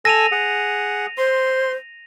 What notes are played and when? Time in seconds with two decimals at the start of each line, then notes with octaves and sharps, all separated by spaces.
0.05 A4 G#5 E6 A#6 D#7 F7
0.32 G#4 F#5
1.18 C5 C6